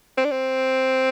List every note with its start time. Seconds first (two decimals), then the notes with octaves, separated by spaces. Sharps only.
0.18 C4
0.25 D4
0.31 C4